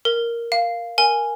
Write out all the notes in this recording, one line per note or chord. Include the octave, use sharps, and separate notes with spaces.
A#4
F5
A#4 G#5